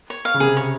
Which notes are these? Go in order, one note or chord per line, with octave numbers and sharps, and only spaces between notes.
C#5
F5
C#3
C3 G#4
C#5